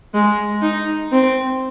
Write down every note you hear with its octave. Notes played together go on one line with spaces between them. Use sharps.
G#3
D#4
C4